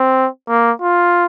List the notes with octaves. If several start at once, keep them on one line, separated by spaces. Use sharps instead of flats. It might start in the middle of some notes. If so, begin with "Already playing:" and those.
Already playing: C4
A#3
F4